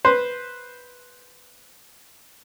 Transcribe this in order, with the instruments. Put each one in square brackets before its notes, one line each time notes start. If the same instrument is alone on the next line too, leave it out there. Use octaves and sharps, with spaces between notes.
[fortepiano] B4 C5